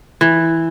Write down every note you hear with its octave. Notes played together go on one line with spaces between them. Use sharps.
E3